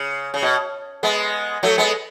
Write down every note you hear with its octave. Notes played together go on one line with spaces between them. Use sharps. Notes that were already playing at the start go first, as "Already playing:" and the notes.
Already playing: C#3
C#3
B2
G#3 B3
F#3 A3
G#3 B3